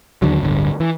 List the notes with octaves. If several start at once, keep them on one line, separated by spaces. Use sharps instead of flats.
D#2 D3 F#3
D1 G1 D3
E3